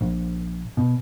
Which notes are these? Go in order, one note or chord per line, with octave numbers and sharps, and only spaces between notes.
A#1
B2